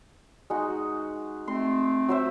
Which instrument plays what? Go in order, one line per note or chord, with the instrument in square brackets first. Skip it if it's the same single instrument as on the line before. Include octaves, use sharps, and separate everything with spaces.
[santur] G#3 D#4 F#4
[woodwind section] A3 C4 [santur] C6
[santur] F#3 C5 E5